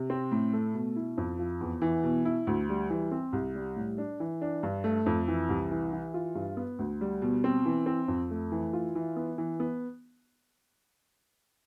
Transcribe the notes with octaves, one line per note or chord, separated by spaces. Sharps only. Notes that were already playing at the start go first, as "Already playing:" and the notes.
Already playing: C3
C4
A2
A3
B2
E4
F2
F3
E2
E3
B2
E4
D2
G3
E3
C4
C2
G3
A2
D4
E3
D4
G2
A3
F2
E3
C2
E3
E3
F4
G2
B3
D2
G3
B2
C4
E3
C4
F2
A3
E3
F4
E3
B3
E3
B3